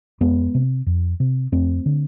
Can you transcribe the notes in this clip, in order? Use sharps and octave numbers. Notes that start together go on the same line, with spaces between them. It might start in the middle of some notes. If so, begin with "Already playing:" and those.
F2 G#3 B3
C3
F2
C3
F2 A3 C4
D3